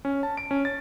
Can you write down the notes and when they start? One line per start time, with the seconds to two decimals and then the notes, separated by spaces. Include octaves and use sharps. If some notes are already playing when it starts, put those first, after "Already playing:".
0.05 C#4
0.23 A5
0.37 D7
0.51 C#4
0.65 A6